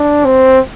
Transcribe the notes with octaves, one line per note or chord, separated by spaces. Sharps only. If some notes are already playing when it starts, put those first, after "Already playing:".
Already playing: D4
C4